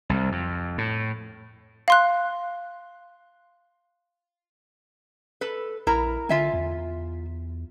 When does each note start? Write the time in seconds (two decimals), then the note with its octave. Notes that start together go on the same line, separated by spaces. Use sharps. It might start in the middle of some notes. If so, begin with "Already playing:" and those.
0.09 C2
0.32 F2
0.78 A2
1.88 F5 C6 F#6
5.41 A4 B4
5.87 A#1 E4 A#4 A#5
6.29 D3 F4 E5 G#5
6.54 E2